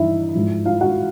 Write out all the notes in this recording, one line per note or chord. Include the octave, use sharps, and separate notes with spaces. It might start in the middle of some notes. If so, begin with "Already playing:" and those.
Already playing: G2 E3 D#4 E4 E5
G#2 F3
F4 F5
F#4 F#5